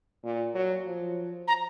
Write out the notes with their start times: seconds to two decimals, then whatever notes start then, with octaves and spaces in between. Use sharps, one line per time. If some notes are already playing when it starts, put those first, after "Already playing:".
0.24 A#2
0.55 F#3
0.86 F3
1.48 A#5